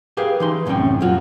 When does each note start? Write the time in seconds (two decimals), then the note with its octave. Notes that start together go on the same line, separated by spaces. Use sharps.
0.17 G4 G#4 A#4 B4 F5
0.40 E3 D#4 C6
0.66 C2 F#2 A2 C4 C#4 G5
1.01 F#2 A#2 F#3 F4 F#4